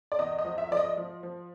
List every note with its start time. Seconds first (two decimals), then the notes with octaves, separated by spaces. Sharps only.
0.12 D5
0.19 E2 D#5
0.39 D#5
0.45 F3
0.58 E5
0.71 F3 D5
0.77 D#5
0.97 F3
1.23 F3